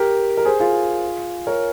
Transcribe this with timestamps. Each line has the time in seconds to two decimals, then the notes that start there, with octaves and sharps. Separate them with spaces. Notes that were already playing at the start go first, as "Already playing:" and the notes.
Already playing: G4 A#4
0.37 A#4
0.45 G#4 C5
0.60 F4 G#4
1.47 A#4 C#5